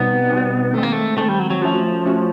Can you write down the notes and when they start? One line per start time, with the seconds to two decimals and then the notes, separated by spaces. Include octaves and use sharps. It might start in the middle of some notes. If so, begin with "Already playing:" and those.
Already playing: B2 G3 B3 C4 D#4
0.30 B2 G3 C4 D#4
0.74 D#3 G#3 A3 C4
0.83 A#3
0.92 A3
1.18 D#3 G#3 A3 C4
1.28 G3
1.39 F#3
1.50 F#3
1.62 F3 A3 C#4 F#4
2.05 A3 C#4 F#4